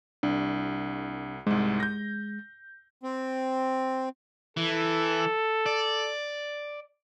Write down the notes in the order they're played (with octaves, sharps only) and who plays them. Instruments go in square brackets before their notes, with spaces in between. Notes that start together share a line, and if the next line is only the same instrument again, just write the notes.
[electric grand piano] C2 [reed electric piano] D4
[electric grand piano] C2 G#2 [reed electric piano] G#3
[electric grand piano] G6 A#6
[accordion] C4
[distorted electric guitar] E3 [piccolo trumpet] A4
[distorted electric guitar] D5